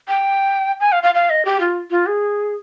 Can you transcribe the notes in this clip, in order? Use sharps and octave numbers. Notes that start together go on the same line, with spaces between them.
G5
G#5
F5
F5
F5
D#5
G4
F4
F4
G#4